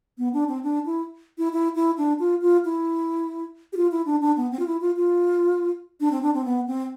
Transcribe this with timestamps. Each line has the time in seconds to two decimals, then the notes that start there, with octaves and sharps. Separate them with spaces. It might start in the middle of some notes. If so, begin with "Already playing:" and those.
0.18 B3
0.33 D4
0.48 C4
0.63 D4
0.86 E4
1.38 E4
1.53 E4
1.75 E4
1.97 D4
2.19 F4
2.42 F4
2.65 E4
3.73 G4
3.77 F4
3.91 E4
4.06 D4
4.21 D4
4.37 B3
4.51 C4
4.59 F4
4.67 E4
4.81 F4
4.96 F4
6.00 D4
6.11 C4
6.22 D4
6.34 C4
6.45 B3
6.67 C4